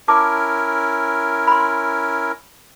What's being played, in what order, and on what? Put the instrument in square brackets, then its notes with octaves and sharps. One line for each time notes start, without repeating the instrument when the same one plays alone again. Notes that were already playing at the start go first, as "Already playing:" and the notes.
[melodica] C#4 E4 A#4 [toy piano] A5 D6
[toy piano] B5 C6